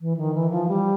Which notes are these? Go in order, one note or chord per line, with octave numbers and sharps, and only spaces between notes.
E3
D#3
E3
F3
G3